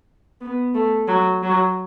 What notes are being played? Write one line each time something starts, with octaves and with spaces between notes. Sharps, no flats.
B3
A3
F#3
F#3